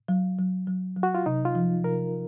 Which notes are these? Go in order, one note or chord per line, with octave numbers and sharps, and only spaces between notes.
F#3
F#3
F#3
F#3
F#4
F4
C3 D#4
F4
F3
C3 A#4